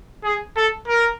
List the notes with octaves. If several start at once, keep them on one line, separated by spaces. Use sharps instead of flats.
G#4
A4
A#4